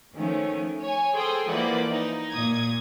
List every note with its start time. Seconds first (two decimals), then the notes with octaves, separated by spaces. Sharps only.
0.15 D#3 F3 A3 C#4
0.80 C#5 G#5
1.14 G#4 A4 C5 G5 C6 D#6
1.47 E3 F3 A#3 B4 D5 F#5
1.89 D#4
2.31 A#2 D#6 G#6